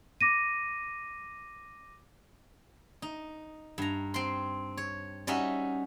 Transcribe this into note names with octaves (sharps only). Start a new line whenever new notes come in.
D6 A#6 D#7
D#4
G2 A#5
C4 C6
C#5
G3 C#4 D#4 F#4 E5